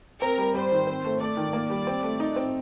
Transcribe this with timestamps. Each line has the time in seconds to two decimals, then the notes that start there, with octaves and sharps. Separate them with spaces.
0.21 C4 A#4
0.38 G3
0.54 G3 C5
0.72 D#3
0.87 C4
1.05 A3
1.20 A3 D5
1.37 D#3
1.53 A#3
1.70 G3
1.87 C4
2.03 A3
2.20 D#4
2.36 C4